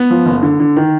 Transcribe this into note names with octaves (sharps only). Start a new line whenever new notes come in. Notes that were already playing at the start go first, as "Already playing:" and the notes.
Already playing: B3
F3
F#1
D3
D3
D#3